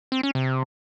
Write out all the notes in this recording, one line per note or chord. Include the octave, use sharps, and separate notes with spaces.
C4
C#4
C3